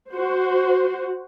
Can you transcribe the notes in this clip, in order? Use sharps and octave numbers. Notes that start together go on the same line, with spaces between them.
F#4 C5